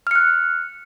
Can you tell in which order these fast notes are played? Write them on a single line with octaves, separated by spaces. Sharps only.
F6 C#7 F#6